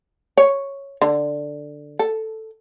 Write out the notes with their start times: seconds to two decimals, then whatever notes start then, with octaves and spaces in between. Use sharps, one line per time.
0.37 C#5
1.02 D3
1.99 A4